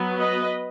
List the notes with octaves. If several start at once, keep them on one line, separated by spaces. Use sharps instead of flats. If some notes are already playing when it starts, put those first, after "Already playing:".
Already playing: F#3 B3
B4 D#5